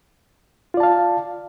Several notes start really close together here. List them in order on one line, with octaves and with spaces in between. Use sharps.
F4 D5 A5 F5